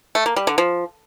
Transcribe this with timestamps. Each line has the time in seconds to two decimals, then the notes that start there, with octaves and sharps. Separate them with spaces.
0.15 A3
0.26 A#3
0.36 G3
0.47 D3
0.58 F3